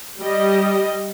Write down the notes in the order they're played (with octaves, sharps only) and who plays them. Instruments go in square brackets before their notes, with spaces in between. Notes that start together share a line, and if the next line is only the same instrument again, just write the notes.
[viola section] G3 D#5